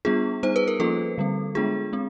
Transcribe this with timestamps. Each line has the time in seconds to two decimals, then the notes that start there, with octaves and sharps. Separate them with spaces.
0.05 G3 B3 D4 F4 G#4
0.43 G3 B3 D#4 C5
0.56 B4
0.68 A#4
0.79 F3 A#3 C#4 F4 A4
1.18 D3 G3 C4
1.55 G#3 B3 D4 F4 G#4
1.93 G#3 C4